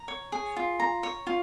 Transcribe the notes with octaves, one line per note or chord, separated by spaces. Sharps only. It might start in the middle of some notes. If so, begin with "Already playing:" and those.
Already playing: A#5
C#5
G#4
F4
A#5
C#5
F4